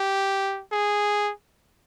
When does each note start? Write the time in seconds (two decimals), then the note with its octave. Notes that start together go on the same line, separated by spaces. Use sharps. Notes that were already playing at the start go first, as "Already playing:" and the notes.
Already playing: G4
0.72 G#4